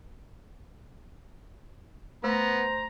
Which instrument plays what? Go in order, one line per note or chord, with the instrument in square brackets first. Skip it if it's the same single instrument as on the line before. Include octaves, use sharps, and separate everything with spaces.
[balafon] A3 [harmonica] B3 [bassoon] C5 [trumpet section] A#5